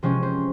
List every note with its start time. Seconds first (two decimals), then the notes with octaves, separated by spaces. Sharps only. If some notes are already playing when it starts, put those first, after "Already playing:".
0.03 C3 F3 G#3 C#4 C5
0.23 C5